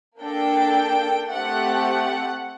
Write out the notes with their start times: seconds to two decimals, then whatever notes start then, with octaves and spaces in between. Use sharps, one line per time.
0.20 A#3 D4 A4 G5
1.29 A3 C4 G4 F#5